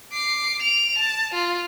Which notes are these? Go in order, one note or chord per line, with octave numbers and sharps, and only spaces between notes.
D6 C7
D7 F7
A5
F4